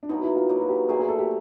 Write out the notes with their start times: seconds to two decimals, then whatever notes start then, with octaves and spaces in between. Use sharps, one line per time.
0.03 D4
0.09 B2 F#3 A#3 D#4
0.23 E4
0.36 F4
0.49 B2 F#3 A#3
0.60 F#4
0.69 G4
0.89 A#2 F#3 A3 G#4
0.99 G#4
1.08 A4
1.19 G4